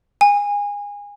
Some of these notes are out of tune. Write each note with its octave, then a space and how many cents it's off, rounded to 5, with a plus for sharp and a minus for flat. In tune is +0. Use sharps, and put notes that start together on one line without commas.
G#5 -25